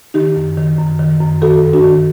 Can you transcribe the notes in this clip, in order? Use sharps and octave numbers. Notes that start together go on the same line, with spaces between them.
D#3 D#4 G4
F#2
D#3
F#2
D#3
F#2
D#3 F#4 A4
G2
D4 F#4
D#3